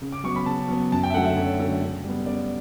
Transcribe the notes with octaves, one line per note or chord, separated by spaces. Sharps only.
C#3
D6
F#3 B3 C#6
B5
C#3 A5
F#3 B3
F#2 A5
G5
E5
D3 F#3 A3 F#5
E5
F#2 C#5
D3 F#3 A3
C#3
G3 B3
C#3 D5